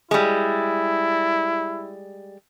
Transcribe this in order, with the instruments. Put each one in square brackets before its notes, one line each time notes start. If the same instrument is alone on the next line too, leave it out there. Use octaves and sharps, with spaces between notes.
[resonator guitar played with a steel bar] G3 G#3 [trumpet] E4